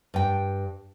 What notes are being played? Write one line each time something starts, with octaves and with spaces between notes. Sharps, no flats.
G2 G5